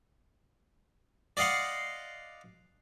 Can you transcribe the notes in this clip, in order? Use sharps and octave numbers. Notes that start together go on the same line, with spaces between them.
D5 D#5 F5 F#5 C6